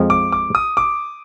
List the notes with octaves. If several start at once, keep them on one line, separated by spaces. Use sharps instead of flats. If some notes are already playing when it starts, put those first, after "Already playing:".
Already playing: F2 F3 G#3
D6
D6
D#6
D6